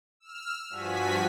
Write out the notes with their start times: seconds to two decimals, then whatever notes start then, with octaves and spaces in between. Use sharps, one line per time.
0.20 E6 F6
0.70 G2 F3 F#4 G#5 B6